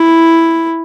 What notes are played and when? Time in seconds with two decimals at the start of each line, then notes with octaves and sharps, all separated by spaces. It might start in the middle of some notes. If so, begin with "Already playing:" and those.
Already playing: E4